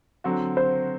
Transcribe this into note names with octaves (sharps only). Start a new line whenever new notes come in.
D3 F#3 C4 F#4
C5